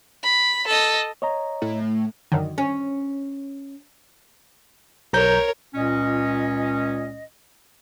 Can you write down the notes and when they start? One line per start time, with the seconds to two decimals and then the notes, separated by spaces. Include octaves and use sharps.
0.24 B5
0.67 A4 D#5
1.22 C#5 D#5 A#5
1.62 A2
2.32 F#2 D3 D#3
2.58 C#4
5.13 B1 A#4 C#5 A#5 G6
5.74 C#2 A#2 C#4 D#5